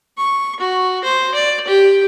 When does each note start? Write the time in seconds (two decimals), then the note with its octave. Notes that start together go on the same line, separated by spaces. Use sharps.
0.18 C#6
0.60 F#4
1.04 C5
1.35 D5
1.67 G4